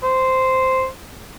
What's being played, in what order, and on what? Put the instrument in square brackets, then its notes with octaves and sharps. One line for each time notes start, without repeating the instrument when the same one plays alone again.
[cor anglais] C5